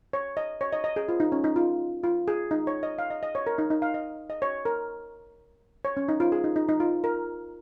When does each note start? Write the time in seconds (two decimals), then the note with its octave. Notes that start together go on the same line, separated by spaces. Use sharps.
0.13 C#5
0.37 D#5
0.61 C#5
0.73 D#5
0.84 D#5
0.96 G#4
1.09 F4
1.20 D#4
1.32 C#4
1.44 D#4
1.56 F4
2.04 F4
2.28 G#4
2.51 D#4
2.67 C#5
2.83 D#5
2.99 F5
3.10 D#5
3.23 D#5
3.35 C#5
3.47 A#4
3.58 D#4
3.70 D#4
3.82 F5
3.94 D#5
4.30 D#5
4.42 C#5
4.65 A#4
5.85 C#5
5.97 C#4
6.09 D#4
6.20 F4
6.32 G#4
6.44 D#4
6.56 D#4
6.69 D#4
6.80 F4
7.04 A#4